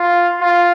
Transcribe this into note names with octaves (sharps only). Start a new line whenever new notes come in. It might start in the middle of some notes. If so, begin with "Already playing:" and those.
Already playing: F4
F4